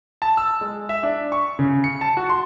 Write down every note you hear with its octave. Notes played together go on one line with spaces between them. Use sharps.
A5
E6
G#3
E5
D4
C#6
C#3
C#7
A5
F#4
C6